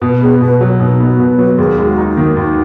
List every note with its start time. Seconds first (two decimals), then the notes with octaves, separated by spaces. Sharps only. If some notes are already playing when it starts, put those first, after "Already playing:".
0.02 B2 B4
0.21 B3 G#4
0.41 B2 B4
0.60 F#3 F#4
0.79 B2 D#4
1.00 B3
1.06 F#4
1.19 B2
1.32 B4
1.38 F#3
1.58 D#2 G#4
1.78 G#3
1.85 F#4
1.98 D#4
2.11 F#4
2.17 D#3
2.37 D#2